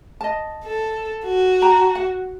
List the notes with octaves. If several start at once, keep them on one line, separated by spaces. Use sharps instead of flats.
D#5 A5
A4
F#4
G5 A5 A#5
F#5